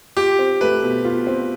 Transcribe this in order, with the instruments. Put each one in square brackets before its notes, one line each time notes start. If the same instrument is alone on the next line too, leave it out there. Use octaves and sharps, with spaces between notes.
[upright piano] F4 [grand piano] G4
[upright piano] C4
[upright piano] A3 [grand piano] B4
[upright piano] B2
F4
C4